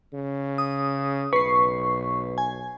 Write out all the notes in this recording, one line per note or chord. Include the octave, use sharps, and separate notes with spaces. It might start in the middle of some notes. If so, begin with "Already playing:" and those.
C#3
D#6
B1 B4 C#6 C7
G#5